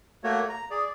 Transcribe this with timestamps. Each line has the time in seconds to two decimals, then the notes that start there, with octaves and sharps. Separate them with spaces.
0.24 A3 A#3 F#4 C#5
0.49 A#5
0.71 G#4 D5